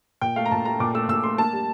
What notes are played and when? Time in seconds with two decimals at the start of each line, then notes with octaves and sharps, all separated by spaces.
0.22 A#2 G5
0.36 A3 F5
0.46 A#5
0.51 A#2 A5
0.65 A3 A#5
0.80 A#2 D6
0.94 A3 E6
1.08 A#2 E6
1.24 A3 C6
1.38 A#3 A5
1.53 G3